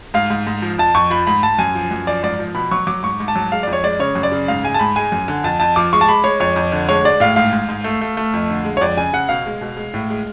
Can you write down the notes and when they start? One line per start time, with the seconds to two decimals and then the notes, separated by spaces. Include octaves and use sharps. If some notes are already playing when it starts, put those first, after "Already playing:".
0.14 G#2 F5
0.30 G#2
0.47 G#2
0.62 F3
0.78 F2 A5
0.94 F2 C#6
1.10 F3 B5
1.27 G#2 B5
1.43 G#2 A5
1.59 F#2 G#5
1.75 F3
1.91 F#2
2.07 F3 D5
2.23 G#2 D5
2.39 F3
2.55 B2 B5
2.71 F#3 C#6
2.87 F#3 D6
3.03 G#2 C#6
3.20 G#2
3.28 A5
3.36 F#3
3.52 G#3 F5
3.63 F2 D5
3.73 C#5
3.83 G#3 D5
3.99 C#3 C#5
4.15 F#2
4.23 D5
4.32 C#3
4.48 G#2 F5
4.63 G#3 G#5
4.74 A5
4.79 G#2 B5
4.96 G#3 G#5
5.12 F#2
5.28 D3
5.44 F2 A5
5.60 F2 A5
5.76 F3 D6
5.93 G#3 C#6
6.01 A5
6.08 G#3 B5
6.24 G#3 C#5
6.40 F2 C#5
6.56 F2
6.72 D3
6.89 G#3 C#5
7.04 G#3 D5
7.20 A2 F5
7.36 G#2 F5
7.53 G#2
7.69 G#2
7.84 A3
8.01 A3
8.17 A3
8.33 F2
8.49 D3
8.65 G#3
8.77 C#5
8.81 F2 D5
8.97 C#3 G#5
9.13 C#3 F#5
9.29 B2 F5
9.46 G#3
9.61 B2
9.77 G#3
9.94 A2
10.10 G#3